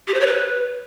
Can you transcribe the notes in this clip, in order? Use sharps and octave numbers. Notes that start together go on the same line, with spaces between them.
G4
C5
C#5
B4